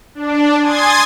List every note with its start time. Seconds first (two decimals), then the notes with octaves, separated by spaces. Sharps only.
0.15 D4
0.62 G#5 C6 D#6 G#6 A6